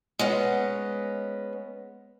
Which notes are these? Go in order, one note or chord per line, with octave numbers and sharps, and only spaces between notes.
G#3 B3 C#4